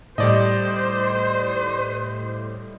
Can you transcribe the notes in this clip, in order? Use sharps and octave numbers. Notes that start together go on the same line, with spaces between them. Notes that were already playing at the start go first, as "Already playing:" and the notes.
A2 G3 C5 D5 D#5